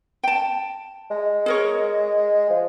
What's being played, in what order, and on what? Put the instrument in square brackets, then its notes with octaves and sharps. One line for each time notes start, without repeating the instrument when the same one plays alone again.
[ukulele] G5 A5
[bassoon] G#3
[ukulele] G#4 A#4 C#5
[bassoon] F3